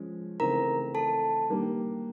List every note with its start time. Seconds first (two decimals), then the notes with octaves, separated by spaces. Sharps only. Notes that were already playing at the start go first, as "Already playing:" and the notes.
Already playing: F3 G#3 C#4
0.40 C#3 E3 A3 C4 D#4 A#4 A#5
0.95 A4 A5
1.50 D#3 G3 A#3 D4 G4